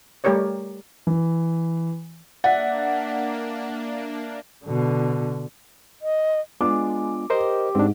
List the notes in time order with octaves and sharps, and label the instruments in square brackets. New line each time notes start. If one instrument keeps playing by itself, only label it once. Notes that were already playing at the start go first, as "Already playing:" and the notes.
[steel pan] G3 A3 G4 A#4 C#5 D5
[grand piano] E3
[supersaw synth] A#3 D4 [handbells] D5 E5 [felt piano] F#5
[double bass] B2 D3
[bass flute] D#5
[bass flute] G#3 [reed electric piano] B3 D4 F4 [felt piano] D6
[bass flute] G4 [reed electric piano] A#4 C5 D#5
[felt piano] G#2 [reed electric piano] C4 D4